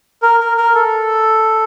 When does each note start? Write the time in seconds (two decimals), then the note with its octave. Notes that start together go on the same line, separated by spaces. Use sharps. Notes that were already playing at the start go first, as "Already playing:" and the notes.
0.22 A#4
0.40 A#4
0.57 A#4
0.74 A4